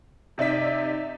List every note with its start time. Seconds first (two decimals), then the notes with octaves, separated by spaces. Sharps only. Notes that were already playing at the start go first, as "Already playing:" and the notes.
0.38 C3 D#4 D5 E5 B6